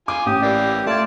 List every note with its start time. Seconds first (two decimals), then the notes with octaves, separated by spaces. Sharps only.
0.08 F4 G#5 D6
0.26 A1 G4 D#6
0.42 E3 A#3 D5
0.87 A3 F4 D5 A5 G#6